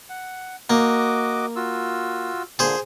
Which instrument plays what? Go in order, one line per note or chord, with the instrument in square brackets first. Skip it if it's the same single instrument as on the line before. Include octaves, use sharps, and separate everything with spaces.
[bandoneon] F#5
[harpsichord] A#3 [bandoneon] F#4 D#5 D6
[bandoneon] F4 F#4 E6
[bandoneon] A#2 D3 [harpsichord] G#4 C5